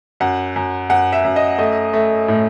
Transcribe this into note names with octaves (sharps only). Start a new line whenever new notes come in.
F#2 F#5
F#2
F#2 F#5
E5
F#2
D#5
A3 D#5
A3
A2